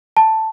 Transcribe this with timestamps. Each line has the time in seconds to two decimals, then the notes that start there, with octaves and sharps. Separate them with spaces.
0.17 A5